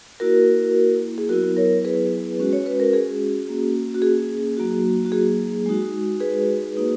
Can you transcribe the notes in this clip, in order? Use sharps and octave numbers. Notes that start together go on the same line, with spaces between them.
A#3 E4 F#4 A#4
G#4
F#3 B3 E4 F#4 A#4
A#4 C#5
G#4 B4
G#3 C#4 F#4
C#5
B4
A#4
G#4
A#3 C#4 F#4
F#4
G#4
F#3 A#3 D#4 F#4
F#4
G#4
G#3 D#4 F#4
G#4 B4
A#3 D#4 F#4